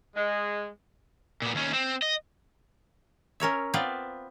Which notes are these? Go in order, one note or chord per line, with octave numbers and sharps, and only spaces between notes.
G#3
A#2 B3
D#2 C#4
C4
D#5
C#4 A#4 C#5 E5
B3 C4 F4 B4 D5 F5